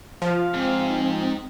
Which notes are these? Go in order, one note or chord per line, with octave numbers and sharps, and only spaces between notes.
F3 F5
G#2 C4
D#4